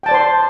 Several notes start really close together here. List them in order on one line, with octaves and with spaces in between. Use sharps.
G5 A5 D5 C5 C6